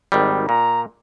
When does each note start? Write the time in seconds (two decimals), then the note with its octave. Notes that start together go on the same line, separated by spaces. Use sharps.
0.12 G#1 D#3 G3
0.49 A#2 A#5